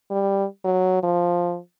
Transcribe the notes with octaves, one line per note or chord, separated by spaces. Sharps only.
G3
F#3
F3